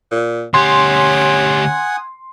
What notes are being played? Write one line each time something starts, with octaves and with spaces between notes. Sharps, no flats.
A#2
D2 C#4 G4 F#5 G#5 C6 D#6